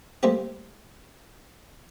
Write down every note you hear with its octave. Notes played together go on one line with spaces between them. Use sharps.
G3 A3 A#3 C4 G#4